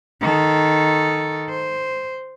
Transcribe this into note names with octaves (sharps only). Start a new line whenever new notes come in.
D#3 A4
C5